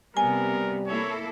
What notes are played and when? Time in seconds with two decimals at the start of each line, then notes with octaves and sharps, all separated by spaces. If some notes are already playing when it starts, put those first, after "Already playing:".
0.17 C3 G3 B3 A#4 G#5
0.87 A#3 E4 A4 C#5